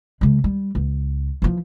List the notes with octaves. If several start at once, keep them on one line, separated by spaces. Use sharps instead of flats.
C#3 G#3
G3
C#2
E3 F3